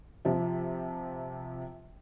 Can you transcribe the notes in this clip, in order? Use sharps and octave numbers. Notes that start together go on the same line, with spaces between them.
C3 F3 E5